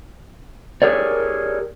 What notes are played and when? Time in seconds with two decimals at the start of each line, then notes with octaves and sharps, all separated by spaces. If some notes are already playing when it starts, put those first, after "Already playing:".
0.82 G4 G#4 A#4 C#5 D5